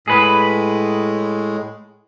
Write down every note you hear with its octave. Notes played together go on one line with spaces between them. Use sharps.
A2 G#3 G#4 B4